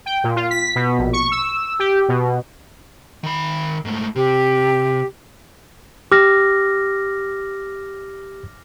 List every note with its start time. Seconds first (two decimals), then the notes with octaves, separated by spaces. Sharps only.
0.06 G5
0.24 A#2
0.36 F4
0.51 B6
0.75 B2
0.98 A#1
1.13 C#6
1.31 E6
1.79 G4
2.09 B2
3.23 D#3 B5
3.85 G#2 A3
4.16 C3 G4
6.12 G4 D6 F6 A#6